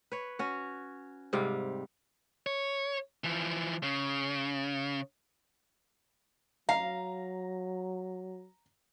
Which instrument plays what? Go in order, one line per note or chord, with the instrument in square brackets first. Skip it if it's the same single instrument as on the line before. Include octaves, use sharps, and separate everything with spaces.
[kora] B4 C#5
C#4 F#4
G#2 C3 G3 F5
[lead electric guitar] C#5
E3 F3
C#3
[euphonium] F#3 [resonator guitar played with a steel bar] F5 [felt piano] A#5